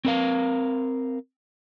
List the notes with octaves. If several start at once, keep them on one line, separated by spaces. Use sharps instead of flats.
C4 A#4 F5